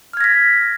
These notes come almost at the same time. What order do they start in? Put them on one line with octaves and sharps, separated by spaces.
F6 G#6 A#6 B6